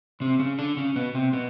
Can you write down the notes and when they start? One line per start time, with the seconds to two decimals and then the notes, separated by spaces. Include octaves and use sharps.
0.20 C3 C4
0.39 C#3 C#4
0.59 D3 D4
0.77 C#3 C#4
0.96 B2 B3
1.15 C3 C4
1.33 B2 B3